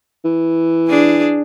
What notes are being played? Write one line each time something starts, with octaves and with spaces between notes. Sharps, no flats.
E3
D4 G#4